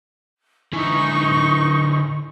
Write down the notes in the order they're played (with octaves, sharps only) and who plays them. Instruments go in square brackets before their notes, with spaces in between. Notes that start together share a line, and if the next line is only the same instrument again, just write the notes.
[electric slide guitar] D3 E4 G#5 [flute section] D#4 C#6